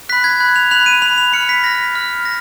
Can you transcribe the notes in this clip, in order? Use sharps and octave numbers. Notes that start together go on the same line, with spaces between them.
B5 F#6 B6
G#6
B5 F#6
F7
B5 F#6 F7
D#7
B5 F#6 F7
F7
B5 F6 C#7
B6
B5 F6 A#6
B5 F6
A#6